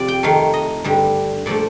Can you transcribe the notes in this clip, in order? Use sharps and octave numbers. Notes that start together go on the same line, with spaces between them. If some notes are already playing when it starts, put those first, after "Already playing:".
Already playing: C3 F3 D5
G5
F2 D#3 A3 F5
D#5
G2 D3 G3
A#2 F3 A3 D5